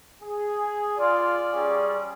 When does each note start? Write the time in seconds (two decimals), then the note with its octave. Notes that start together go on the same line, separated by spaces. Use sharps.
0.22 G#4
0.99 F4 D5
1.52 G3 C#4 G#4